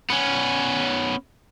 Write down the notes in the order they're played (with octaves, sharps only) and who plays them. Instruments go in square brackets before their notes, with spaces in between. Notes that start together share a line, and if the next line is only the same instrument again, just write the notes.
[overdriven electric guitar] B3 C#4